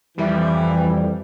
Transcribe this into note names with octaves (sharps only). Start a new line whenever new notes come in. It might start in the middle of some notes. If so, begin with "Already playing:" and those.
F2 E3 G3